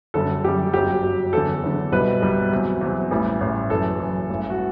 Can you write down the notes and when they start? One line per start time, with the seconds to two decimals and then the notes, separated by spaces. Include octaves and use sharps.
0.14 F#1 F#2 D3 G3 A4
0.43 F#1 F#2 D3 G3 G4
0.74 G1 F#2 F#3 G4
1.03 G1 F#2 F#3
1.33 F#1 E2 D3 A4
1.63 F#1 E2 D3
1.92 C2 B2 G3 B4
2.22 C2 B2 G3
2.51 E2 C3 F#3
2.81 E2 C3 F#3
3.11 A1 A2 E3 G3
3.41 A1 A2 E3 G3
3.70 F#1 F#2 E3 A4
3.99 F#1 F#2 E3
4.30 A1 G2 E3
4.50 F#4